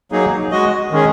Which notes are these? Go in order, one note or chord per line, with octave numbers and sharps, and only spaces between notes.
F#3 A#3 D#4 G#4
G#3 F#4 D#5
D#3 G#3 C#4 G#4